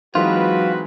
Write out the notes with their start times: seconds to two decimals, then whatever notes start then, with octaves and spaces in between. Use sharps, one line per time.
0.15 E3 F#3 G#3 C4 D#4 F4 F#4 B4